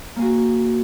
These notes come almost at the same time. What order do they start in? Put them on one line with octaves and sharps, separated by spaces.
A#3 G#4 F#4